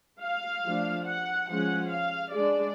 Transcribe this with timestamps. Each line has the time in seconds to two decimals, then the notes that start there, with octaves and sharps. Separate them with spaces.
0.22 F5
0.64 F3 A3 D4
1.06 F#5
1.48 F3 G#3 C#4 F#5
1.90 F5
2.32 G#3 D4 D5